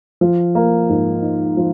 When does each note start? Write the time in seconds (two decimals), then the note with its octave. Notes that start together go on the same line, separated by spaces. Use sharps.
0.21 F3
0.55 A#3
0.89 G#2
1.22 D#4
1.57 F3